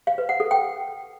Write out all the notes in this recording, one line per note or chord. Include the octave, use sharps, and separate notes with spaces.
F5
B4
F#5
A4
G5